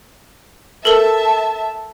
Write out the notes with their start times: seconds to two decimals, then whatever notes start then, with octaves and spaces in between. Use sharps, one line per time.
0.85 A4 A#4 E5 A5 G7